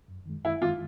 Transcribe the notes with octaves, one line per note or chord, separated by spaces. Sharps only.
F#2
D#3 G#3
F#2 E4
D#3 G#3 F4